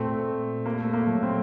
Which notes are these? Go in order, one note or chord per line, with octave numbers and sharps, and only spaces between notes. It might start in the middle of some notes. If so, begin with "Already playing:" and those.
Already playing: A#2 A3 C4
A#3
A3
A#3
F#3 A3
C4